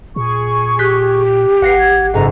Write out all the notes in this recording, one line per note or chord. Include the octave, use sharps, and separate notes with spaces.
A#2 G#4 C#6
G4 F#6 G6 B6
G#1 B4 F5 F#5 A#6 C7
G#6
F#1 G#2 A4 A#5